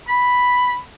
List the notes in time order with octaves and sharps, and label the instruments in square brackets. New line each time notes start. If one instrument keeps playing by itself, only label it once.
[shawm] B5